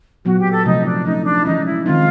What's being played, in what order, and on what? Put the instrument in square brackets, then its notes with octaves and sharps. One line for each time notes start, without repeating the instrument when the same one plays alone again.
[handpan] A#2 F#3 B3 [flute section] F#4
[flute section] G4
A4
[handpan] C3 F3 A3 [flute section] D#4
[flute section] D4
[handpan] F3 A3 C#4 [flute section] D#4
[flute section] D4
E4
[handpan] E3 G#3 C#4 [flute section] D#4
[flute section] E4
[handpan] D#3 G#3 C4 D#4 [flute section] F4